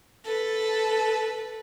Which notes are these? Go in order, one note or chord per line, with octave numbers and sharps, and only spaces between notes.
A4 B4